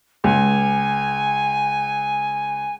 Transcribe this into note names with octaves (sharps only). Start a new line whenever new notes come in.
C#2 G#5